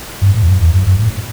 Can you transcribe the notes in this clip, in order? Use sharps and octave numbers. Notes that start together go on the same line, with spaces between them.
G2
A2
E2
F#2
E2
F#2
F#2
A2